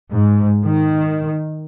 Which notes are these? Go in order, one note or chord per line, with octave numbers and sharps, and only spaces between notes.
G#2
D#3